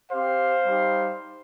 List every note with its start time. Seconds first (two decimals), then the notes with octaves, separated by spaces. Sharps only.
0.12 C4 G4 C5 F5
0.65 G3 D#4 G4